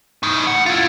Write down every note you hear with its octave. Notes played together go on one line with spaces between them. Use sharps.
A2 D#4
F#5
E4 F4